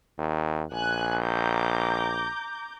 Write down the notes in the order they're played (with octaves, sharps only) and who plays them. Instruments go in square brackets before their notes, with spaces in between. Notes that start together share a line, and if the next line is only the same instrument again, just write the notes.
[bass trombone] D#2
[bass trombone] A#1 [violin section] G#5 F#6
[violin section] A#5 D6 G6